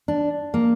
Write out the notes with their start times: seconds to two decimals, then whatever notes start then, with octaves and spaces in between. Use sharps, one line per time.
0.08 D4
0.54 A#3